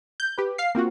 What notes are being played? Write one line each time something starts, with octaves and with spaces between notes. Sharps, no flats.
G6
G4 B4
F5 C7
A#3 C4 F4 F#4